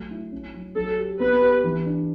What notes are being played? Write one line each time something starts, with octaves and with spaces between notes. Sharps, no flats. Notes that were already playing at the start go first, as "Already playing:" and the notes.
Already playing: F#3 A3
E4
C#4
F#3
F#3 A4
G4
B3 B4
G4
E3
D4